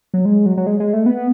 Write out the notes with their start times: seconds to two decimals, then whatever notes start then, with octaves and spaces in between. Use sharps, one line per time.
0.14 F#3
0.25 G#3
0.46 F#3
0.57 F#3
0.67 G#3
0.80 G#3
0.93 A3
1.06 B3